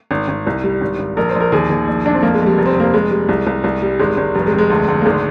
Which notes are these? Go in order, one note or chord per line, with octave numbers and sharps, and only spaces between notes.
G#1
G#1
C2
G3
G#1
G#1
A#1 A#4
C5
A#1
A#4
D#2 G#4
D#2
A#1
A#1 D4
C4
F2 A#3
G#3
F2
G3
F1
C4
F1 A#3
F1 G#3
G3
C2
C2
C2
G3
G#1 G#3
G#1
F1 G3
G#3
F1
G#3
D2
D2
A#3
G#1 G#3